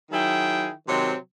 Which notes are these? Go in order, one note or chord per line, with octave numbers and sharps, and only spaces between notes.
D#3 F#3 E4 G#4 G5
C3 D#3 F#3 G#3 C4